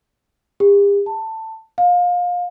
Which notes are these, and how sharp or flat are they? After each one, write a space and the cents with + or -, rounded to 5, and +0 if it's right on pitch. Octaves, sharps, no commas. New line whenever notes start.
G4 +45
A5 +15
F5 +25